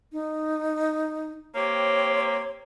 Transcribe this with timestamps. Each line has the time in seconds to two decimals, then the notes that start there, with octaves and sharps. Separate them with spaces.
0.12 D#4
1.55 A#3 C4 G4 C#5